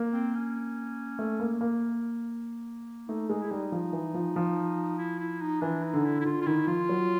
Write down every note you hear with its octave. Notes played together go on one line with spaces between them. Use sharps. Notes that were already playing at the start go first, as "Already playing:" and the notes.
Already playing: A#3
C4
C#4
A3
A#3
A#3
A3 D#4
G#3 D#4
E4
G3 D#4
F3
E3
F3
F3
E4
E4
D#4
E3 D4
D#4
D3
E4
E4
D3 F4
F4
D#3 E4
F3 F4
F#3